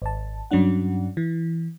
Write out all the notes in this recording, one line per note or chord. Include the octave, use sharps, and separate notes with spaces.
G#1 A5
G2 F#3 C#4 D4 F#5
E3